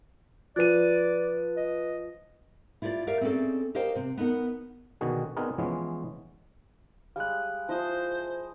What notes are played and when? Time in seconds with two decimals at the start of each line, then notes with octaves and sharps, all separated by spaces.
0.56 F3 B4 D5 F#6 D#7
1.57 D#5
2.82 E4 F4 G4 A#4 D5
3.07 G4 A#4 D5 E5 F5
3.21 C4 C#4 D#4 G#4 A4 D5
3.75 G4 A#4 C5 D#5 F5 G5
3.95 C3 C4
4.18 B3 D#4 A#4 F#5
5.01 B2 D3 D#3 F#4 G#4
5.36 B3 C4 D4 D#4 G#4 A#4
5.58 E3 F3 G#3 B3 C#4
7.16 G3 G#3 F5 D#6 F#6
7.69 F3 E4 C5 D#5